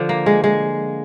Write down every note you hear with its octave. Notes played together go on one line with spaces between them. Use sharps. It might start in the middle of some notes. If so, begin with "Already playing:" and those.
Already playing: D3 F3
A#3
G#3
G#3